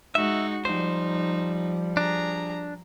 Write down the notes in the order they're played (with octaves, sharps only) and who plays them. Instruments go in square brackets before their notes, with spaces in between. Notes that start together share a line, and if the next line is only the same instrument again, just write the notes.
[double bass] G#3 [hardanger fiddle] D#4 F#4 [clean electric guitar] E5
[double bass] F3 G3 [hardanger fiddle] D#4 [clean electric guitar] C5
[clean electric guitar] D4 [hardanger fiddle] G#4 A#5